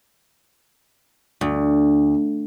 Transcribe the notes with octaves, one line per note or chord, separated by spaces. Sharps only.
D2